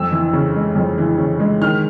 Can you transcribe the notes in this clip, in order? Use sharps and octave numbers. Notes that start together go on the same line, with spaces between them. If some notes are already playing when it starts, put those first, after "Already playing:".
Already playing: F2 E6
E3
C#3
G#3
F2
E3
C#3
G#3
D#3 F6